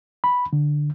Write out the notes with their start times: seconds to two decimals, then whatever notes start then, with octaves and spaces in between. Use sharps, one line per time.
0.24 B5
0.53 D3